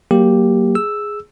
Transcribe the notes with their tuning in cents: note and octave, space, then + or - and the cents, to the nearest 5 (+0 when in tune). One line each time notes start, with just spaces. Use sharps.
F#3 +25 A#3 +0 G4 +0
G#4 +0 E6 +0